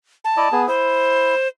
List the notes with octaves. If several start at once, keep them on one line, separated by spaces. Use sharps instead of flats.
A5
E4 D5 D#5
B3 G#4
E4 C5